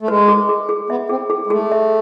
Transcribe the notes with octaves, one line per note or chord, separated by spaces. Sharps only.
A3
G#3 B4
G#4
G#4
G#4
B3 E5
C4 G#4
G#4
G#3
A3 G#4
E5